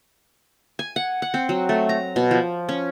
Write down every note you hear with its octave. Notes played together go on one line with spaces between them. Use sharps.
G#5
F#5
F#5
C4
F#3
A3
A#5
B2
F3
C#4